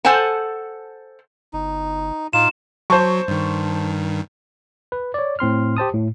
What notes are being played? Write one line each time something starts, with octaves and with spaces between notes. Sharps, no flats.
A4 C5 F#5 G#5 A5
G1 D#4
A2 D#4 F4 F5 E7
F#3 C5 A5 C#6
G2 D#3
B4
C#5 D5
A2 C4 C6 F6
G4 C5 A5 D#6
A2